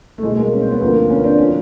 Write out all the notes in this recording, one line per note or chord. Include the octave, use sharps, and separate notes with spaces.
A3
C2 B2 G#3
G#3 A#3
C#4
C4
B3
D2 D3 F3 A#3 C4
B3 C#4
C4 D4
A2 F3 C#4